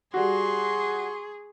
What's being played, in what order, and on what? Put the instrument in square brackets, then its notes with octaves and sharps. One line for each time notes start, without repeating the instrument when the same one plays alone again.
[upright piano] G3 F#4 [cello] G#4 [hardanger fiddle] C6 C#6